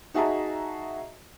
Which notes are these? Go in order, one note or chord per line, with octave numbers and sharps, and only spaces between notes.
D#4 F#4 G#4 E5 A5 A#5